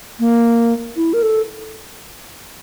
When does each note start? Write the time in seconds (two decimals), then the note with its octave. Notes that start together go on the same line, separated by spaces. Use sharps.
0.20 A#3
0.97 E4
1.13 A#4
1.22 A4